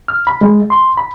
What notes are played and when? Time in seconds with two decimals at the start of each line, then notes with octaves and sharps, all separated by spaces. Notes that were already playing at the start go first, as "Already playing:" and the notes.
0.08 F6
0.27 B5
0.41 G#3
0.70 C6
0.97 B5